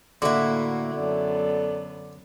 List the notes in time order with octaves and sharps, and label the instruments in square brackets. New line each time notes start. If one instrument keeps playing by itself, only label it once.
[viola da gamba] A2 A#3 [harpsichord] D3 [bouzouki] E4 F#4
[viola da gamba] F#2 B3 [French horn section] A4 D5